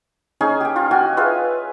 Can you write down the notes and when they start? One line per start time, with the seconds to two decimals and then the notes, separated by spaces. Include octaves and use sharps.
0.41 C#4 D#4 G#4 G#5
0.61 G4 G5
0.76 F4
0.91 F#4 G5 G#5
1.17 F4 G#4 B4 E5